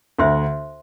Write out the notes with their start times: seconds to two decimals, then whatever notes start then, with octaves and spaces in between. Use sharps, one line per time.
0.18 D2 D3 C5 E5 C6